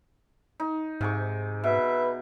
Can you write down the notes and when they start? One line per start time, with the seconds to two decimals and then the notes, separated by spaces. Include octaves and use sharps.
0.60 D#4
1.01 G#2 C3 G#4 C#6
1.64 B2 B4 E5